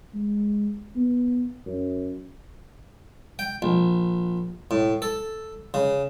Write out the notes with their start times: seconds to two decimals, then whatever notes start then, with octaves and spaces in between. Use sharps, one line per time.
0.14 G#3
0.96 B3
1.66 F#2
3.39 G5
3.62 A#1
4.71 A2
5.02 A4
5.74 C#3